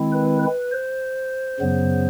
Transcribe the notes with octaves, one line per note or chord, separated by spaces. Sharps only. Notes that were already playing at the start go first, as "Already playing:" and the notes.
Already playing: D#3 G#3 C4 E4
B4
B4
C5
F#2 C#3 F#3 B3